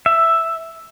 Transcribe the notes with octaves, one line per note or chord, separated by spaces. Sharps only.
E5